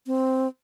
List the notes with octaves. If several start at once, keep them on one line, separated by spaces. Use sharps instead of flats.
C4